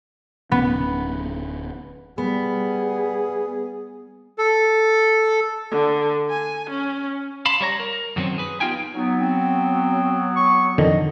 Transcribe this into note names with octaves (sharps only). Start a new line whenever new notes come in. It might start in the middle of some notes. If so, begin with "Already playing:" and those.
D1 B3 C#4
G3 B3 G#4
A4
D3
G#5
C#4
F5 A5 B5 C6
G3 C#5 A#5
A#4
F#2 D#3 F#3 A3 C4 C#4
G#4 B4
B3 D#4 F4 G4 G5 G#5
F#3 B3 D#4
C4
C#6
F2 D3 D#3 D#5